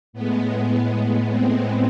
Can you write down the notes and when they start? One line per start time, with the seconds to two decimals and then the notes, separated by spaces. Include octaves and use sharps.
0.13 A2 G#3 B3
0.52 B3
0.92 B3
1.31 C4